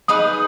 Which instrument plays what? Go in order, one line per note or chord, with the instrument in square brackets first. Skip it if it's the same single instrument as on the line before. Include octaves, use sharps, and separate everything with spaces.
[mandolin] D#4 G#4 B4 [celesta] D#6